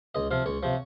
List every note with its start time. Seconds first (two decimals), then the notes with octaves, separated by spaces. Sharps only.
0.15 C#2 D#5
0.31 C3 F3 F5
0.46 C#2 C#5
0.63 C3 F3